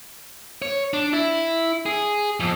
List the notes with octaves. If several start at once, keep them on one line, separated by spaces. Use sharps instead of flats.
C#5
D4
E4
G#4
F2